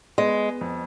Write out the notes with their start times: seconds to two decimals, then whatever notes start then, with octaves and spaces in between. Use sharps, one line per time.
0.18 G#3 B3
0.61 F2